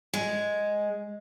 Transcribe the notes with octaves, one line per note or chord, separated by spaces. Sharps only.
G#3